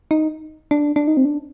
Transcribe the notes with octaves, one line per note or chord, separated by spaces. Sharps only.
D#4
D4
D4
D#4
C4
D4